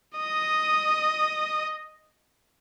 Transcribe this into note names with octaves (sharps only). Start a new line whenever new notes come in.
D#5 D#6